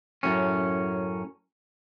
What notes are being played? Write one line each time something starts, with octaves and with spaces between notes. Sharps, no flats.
F#2 A2 C#4